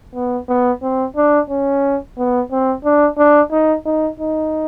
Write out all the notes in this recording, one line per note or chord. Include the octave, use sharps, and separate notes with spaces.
B3
B3
C4
D4
C#4
B3
C4
D4
D4
D#4
D#4
D#4